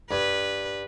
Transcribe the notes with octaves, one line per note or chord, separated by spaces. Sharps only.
G2 B4